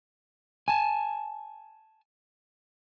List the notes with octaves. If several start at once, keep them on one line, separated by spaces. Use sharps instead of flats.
G#5 A5